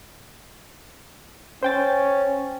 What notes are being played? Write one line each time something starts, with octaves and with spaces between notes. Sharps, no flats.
C#4 C5 G5 A6